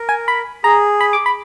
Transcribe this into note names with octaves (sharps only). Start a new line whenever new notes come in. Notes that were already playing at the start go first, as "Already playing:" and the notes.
Already playing: A#4
G#5
B5
G#4 A#5
B5
D6
B5